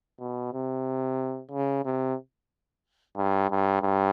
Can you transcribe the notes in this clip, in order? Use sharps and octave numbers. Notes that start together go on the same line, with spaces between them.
B2
C3
C#3
C3
G2
G2
G2